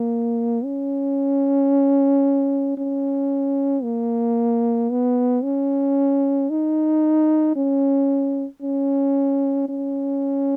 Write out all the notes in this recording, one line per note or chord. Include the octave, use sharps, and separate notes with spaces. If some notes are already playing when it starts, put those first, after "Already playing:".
Already playing: A#3
C#4
C#4
A#3
B3
C#4
D#4
C#4
C#4
C#4